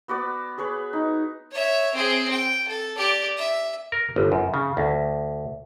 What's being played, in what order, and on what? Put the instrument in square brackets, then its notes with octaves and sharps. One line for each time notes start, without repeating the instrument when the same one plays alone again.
[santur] B3 F#4 B4 D5
G#4 B4 C#5
D#4
[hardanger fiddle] C#5 E5
C4 G#4
G5
A4
G4 D5
E5
[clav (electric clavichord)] A#4
G1
F#2
C#3
D2